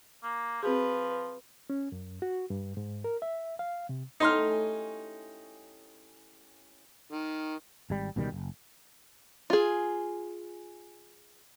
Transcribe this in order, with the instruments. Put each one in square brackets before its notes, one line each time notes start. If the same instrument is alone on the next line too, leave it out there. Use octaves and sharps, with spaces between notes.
[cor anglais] A#3
[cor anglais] F3 [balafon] C4 F#4 G#4 [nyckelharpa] B4
[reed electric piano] C#4
F#2
F#4
G2
G#2
A#4
E5
F5
C3
[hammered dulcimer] A2 C#4 G4 [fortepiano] D#4 C6 F6
[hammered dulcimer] G#5 C#6
[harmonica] D#3
[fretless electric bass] G#1 G3
C#2 B2 D#3 G3
F#1
[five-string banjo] F4 G#4